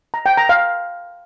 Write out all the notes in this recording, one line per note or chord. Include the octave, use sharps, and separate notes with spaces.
A#5
G5
A#5
F5